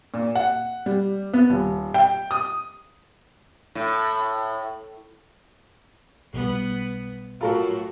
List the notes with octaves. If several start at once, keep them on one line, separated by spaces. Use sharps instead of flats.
A#2
F#5
G3
B3
D#1
G5
D#6
A2
B1 G3 B3
A2 F#3 F4 F#4 A4 A#4